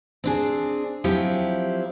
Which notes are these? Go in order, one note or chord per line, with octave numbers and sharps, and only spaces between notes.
C4 D4 G#4
F3 F#3 C4 E4 G4